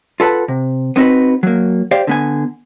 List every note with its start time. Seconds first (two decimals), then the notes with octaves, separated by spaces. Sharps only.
0.20 F4 A4 B4 F#5 A5
0.48 C3
0.96 B3 C4 D#4 F#4 B4
1.43 F#3 A#3
1.91 G4 C5 D5 F5
2.07 D3 B3 G#5